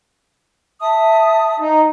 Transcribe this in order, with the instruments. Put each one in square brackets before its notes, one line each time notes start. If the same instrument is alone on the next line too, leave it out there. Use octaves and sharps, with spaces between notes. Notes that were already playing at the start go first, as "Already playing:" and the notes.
[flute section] E5 A5 D#6
[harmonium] D#4